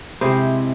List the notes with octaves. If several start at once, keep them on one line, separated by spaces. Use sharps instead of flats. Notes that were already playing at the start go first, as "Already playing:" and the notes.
C3 G#3 C4 E4 C5